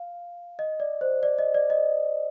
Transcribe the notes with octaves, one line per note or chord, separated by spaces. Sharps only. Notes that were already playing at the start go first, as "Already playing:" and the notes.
Already playing: F5
D#5
D5
C5
D5
D#5
D5
D#5